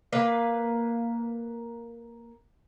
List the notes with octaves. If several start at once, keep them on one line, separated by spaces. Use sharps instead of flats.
A#3 B4 F5